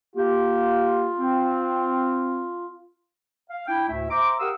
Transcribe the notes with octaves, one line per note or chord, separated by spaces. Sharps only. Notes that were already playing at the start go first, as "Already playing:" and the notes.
A#3 F4 G4
C4
F5
D4 E4 G5
D2 A2 A3 E4 E5
C5 E5 A#5 C6 D6
G4 A#4 F5 F#5 D#6 E6